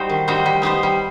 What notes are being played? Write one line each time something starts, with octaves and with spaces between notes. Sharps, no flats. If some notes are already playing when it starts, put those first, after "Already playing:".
Already playing: G3 D#4 F#4 C5
D#3
G3 D#4 F#4 C5
G3
B3 D#4 G4 C5
G3